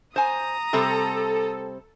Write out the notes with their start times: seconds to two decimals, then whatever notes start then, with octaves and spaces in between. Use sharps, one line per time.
0.16 C5 G#5 A#5 D#6
0.73 C3 G3 C4 A4